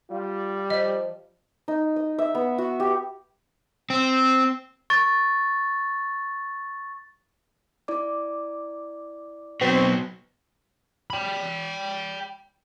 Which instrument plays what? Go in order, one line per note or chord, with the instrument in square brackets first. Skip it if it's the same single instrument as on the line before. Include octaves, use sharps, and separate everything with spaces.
[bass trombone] G3 [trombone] F4
[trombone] F3 [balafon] D#5
[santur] D#4
D#5
E5
B3
F#4
G4
[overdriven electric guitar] C4
[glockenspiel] C#6 A6
[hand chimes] E4 D5 D6
[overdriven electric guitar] B2 F#3 [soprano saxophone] C4
[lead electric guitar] G5 B5